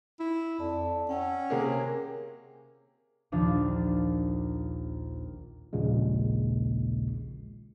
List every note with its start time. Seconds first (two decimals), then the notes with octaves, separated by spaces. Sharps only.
0.20 E4
0.60 F2 D5 A5
1.09 C#4 F#5 G5 E6
1.50 C3 A#3 G#4 A#4 C#5 G5
3.32 A#1 D#2 F3 D4 F5 D6
5.73 A#1 D#2 A#2 C#3 G#3